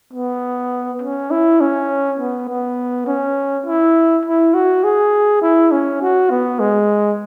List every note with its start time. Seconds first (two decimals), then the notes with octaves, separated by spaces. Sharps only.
0.13 B3
1.02 C#4
1.31 E4
1.60 C#4
2.19 B3
2.49 B3
3.07 C#4
3.66 E4
4.25 E4
4.54 F#4
4.84 G#4
5.42 E4
5.71 C#4
6.02 F#4
6.30 B3
6.59 G#3